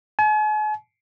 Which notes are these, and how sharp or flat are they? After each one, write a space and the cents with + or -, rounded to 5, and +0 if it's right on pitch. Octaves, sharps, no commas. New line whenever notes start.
G#5 +45